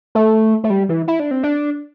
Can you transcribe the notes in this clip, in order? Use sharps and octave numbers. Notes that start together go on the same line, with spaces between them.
A3
A3
G3
E3
E4
D4
C4
D4